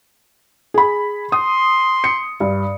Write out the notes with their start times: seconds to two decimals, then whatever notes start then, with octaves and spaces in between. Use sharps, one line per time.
0.74 G#4 B5
1.32 C6 D#6
2.04 C#7
2.40 G2